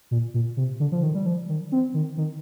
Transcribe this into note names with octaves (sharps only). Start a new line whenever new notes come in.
A#2
A#2
C3
D3
F3
D#3
G3
F3
D#3
C4
D#3
D#3